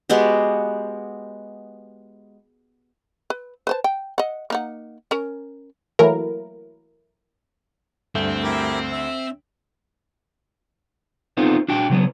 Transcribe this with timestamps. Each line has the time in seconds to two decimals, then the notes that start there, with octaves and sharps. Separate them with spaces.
0.10 G#3 B3 F#4 G4
3.30 B4
3.67 B4 C5 A5
3.84 G5
4.18 D#5 F#5
4.50 A#3 D#4 F#5
5.11 C#4 A#4
5.99 E3 F#3 A3 A#3 E4 A#4
8.15 D2 G2 A3 C4 G6
8.43 E4 G4 A#4
8.92 E5
11.37 B3 C4 D#4 F4 A4 C5
11.68 D4 F#4 G5
11.90 C#3 F#3 B3